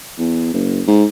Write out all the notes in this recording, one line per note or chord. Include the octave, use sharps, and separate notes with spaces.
E2
F#1
G#2